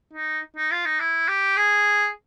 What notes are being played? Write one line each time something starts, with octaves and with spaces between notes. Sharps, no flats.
D#4
D#4
F4
D#4
E4
G4
G#4